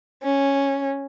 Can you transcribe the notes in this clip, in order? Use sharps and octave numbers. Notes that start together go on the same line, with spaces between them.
C#4